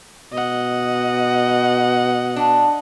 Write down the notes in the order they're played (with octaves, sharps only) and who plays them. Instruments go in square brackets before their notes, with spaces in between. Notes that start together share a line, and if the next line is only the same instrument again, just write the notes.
[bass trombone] B2 [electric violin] D#5 F#5
[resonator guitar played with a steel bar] D4